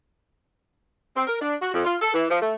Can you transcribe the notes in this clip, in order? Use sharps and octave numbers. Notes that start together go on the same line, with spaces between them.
C4
A#4
D4
F#4
F2
F4
A4
E3
F3
A3